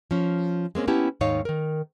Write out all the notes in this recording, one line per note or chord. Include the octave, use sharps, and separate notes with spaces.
F3 C#4
G#3 A#3 C4 C#4
B3 C#4 E4 G4 A5
D#2 G#2 D#3 D#4 C#5 F5
D#3 A#4